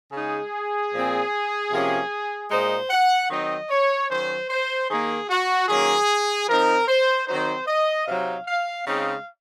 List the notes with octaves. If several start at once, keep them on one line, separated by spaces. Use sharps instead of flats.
C#3 G#3 D#4 G#4
A#2 F3 C4
C3 F3 A#3 C#4
A#2 G#3 D#4 C5
F#5
D#3 F#3 C4 D#4 D#5
C#5
D#3 F#3 C#4 C5
C5
D#3 A#3 D#4 G#4
F#4
D#3 F#3 A#3 C#4 G#4
F3 C4 D#4 A#4
C5
D#3 F#3 C4 D#4 C5
D#5
C3 F#3 C4 D#4 F5
F5
C#3 G#3 C4 D#4 F5